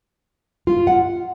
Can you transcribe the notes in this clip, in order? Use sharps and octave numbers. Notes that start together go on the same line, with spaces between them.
F4
F#5